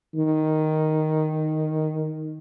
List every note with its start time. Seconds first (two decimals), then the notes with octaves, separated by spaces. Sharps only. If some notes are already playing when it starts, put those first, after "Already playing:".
0.15 D#3